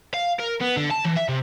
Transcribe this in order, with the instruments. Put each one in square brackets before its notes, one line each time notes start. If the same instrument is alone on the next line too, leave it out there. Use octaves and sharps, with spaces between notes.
[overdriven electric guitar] F5
A#4
B3
D3
A5
E3
E5
C3